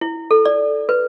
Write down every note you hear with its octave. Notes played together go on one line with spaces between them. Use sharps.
E4
A4
D5
B4